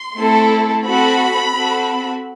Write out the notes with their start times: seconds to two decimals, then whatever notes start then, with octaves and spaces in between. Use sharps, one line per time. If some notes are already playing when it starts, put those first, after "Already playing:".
Already playing: C6
0.17 A3 C4 E4 A4
0.84 C4 F#4 A4 B5
1.53 C4 F#4 A4